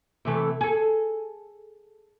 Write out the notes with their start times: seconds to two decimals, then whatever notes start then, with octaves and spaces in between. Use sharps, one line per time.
0.25 C3 E3 A3
0.61 G#4 A4